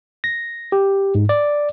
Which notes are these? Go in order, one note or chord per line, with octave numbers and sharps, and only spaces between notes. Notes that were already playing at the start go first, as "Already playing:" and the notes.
A#6
G4
G#2
D5